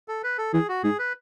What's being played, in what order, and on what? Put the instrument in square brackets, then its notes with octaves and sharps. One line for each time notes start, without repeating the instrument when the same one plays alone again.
[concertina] A4
B4
A4
[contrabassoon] E3 [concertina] G#4
[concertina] F#4
[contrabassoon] G#2 [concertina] G#4
[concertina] B4